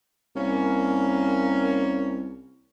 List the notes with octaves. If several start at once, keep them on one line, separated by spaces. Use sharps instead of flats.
C2 A#3 C#4